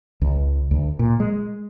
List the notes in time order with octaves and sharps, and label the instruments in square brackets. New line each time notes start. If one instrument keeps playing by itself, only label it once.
[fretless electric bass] C#2
D2
A#2
G#3